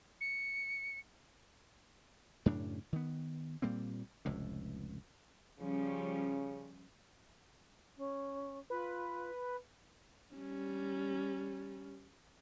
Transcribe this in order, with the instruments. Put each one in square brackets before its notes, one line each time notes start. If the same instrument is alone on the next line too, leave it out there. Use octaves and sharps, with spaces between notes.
[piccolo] C#7
[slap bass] F#2 A2 C#3 D4
D#3 B3
A#2 G3 A#3 C4
F1 C#2 A2
[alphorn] C#3 [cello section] F3 G3 C#4
[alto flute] C#4
[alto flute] F4 [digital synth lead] B4
[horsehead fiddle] G3 C#4